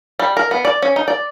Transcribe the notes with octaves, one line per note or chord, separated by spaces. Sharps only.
G3
A#4
B3
D5
C#4
D#4
D5